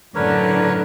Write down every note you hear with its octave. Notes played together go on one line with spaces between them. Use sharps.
F#2 A2 D3 A#4 B4 C#5